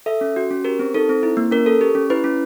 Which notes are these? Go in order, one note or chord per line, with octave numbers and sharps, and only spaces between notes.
A4 E5
C#4
F#4
C#4
G4 A#4
C4
D#4 A4
C4
E4
A#3
C#4 A#4
A4
G4
C#4
E4 B4
C#4